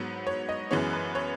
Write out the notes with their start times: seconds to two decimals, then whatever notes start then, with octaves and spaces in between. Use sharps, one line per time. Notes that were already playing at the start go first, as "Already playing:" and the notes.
Already playing: G#2 F#3 B3
0.27 C#5
0.49 D#5
0.71 F#2 E3 G#3 B3 C#5
0.93 B4
1.15 C#5